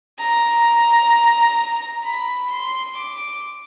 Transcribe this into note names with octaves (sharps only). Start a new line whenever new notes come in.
A#5
B5
C6
D6